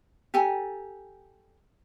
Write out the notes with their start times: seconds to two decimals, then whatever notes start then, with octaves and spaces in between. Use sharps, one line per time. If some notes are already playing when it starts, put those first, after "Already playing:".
0.34 G4 A4 G#5 A#5